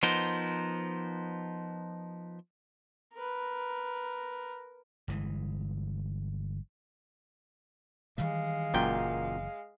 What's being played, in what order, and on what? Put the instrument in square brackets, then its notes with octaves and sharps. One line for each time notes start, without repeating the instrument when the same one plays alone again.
[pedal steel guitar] F3 B3 D#4 A#4 C5
[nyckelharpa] A#4 B4
[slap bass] G1 E3 G#3
[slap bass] D#3 E3 G3 [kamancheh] G#3 F5
[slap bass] F#1 E3 [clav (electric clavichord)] F#2 A#2 G5